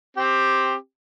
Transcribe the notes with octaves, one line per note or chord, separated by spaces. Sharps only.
C4 G4